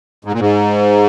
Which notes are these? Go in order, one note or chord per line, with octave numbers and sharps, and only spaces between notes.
G#2
A#2
G#2